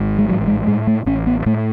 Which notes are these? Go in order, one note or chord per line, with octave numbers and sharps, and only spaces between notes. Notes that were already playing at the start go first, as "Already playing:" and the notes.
Already playing: G#1 G#2
G#3
A1 F#3
G#3
A2 G#3
A3
A1 C#4
B3
A2 A3